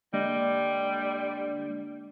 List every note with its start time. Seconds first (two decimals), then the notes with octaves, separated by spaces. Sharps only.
0.14 D3 G3 G#3 A#3 D#5